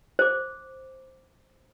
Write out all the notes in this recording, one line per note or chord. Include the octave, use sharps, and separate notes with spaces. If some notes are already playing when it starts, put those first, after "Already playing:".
C5 D6